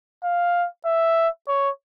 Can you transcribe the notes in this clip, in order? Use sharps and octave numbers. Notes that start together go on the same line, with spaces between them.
F5
E5
C#5